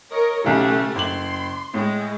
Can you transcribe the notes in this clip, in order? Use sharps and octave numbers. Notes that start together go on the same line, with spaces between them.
A#4 C#5 D#5
B1 C#3 E3 A3 G4
F#1 C6 F#7
A2 G#3